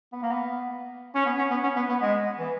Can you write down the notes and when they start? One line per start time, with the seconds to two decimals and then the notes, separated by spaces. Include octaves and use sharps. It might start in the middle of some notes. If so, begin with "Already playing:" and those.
0.13 B3
0.22 A#3
0.31 B3
1.15 C#4
1.26 B3
1.38 C#4
1.51 B3
1.63 C#4
1.76 B3
1.88 B3
2.02 G#3
2.38 E3